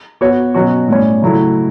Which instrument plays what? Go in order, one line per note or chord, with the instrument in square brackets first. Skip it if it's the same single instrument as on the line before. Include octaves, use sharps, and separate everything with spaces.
[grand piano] B3 F#4 C#5
B2 F#3 C#4 F#4
A2 G3 C#4
C#3 F#3 A3 E4